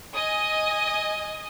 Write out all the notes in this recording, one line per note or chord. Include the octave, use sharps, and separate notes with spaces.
D#5 G#5 D#6